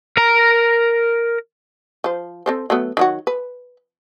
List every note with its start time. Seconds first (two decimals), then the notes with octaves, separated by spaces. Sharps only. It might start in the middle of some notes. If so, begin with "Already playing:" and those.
0.17 A#4 A#5
2.04 F3 C5
2.46 C4 A4 C5
2.70 F#3 A3 B3
2.97 D#3 F#3 F#4
3.27 B4